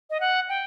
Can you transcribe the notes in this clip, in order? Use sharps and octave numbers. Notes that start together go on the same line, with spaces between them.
D#5
F#5
G5